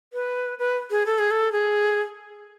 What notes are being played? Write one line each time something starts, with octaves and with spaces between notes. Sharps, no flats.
B4
B4
G#4
A4
G#4
A4
G#4